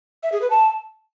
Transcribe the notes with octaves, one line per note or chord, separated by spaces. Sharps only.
E5
G#4
B4
A5